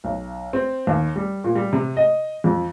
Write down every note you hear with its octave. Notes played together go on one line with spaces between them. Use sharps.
B1
C4
D#2
G3
A#2
G3
C3
D#5
F2